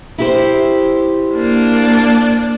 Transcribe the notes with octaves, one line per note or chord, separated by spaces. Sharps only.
E4 G4 C5
A#3 D4